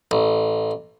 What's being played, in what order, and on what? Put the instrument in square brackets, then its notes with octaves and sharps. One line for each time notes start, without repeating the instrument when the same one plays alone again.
[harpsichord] A1